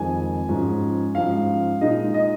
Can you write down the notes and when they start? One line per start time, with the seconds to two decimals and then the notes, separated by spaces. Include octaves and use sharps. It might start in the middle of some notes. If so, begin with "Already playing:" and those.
Already playing: F2 D#3 G#3 G#5
0.49 G#2 F3 C#4
1.15 G#2 F3 C#4 F5
1.81 A#2 G#3 D#4 D#5
2.14 D#5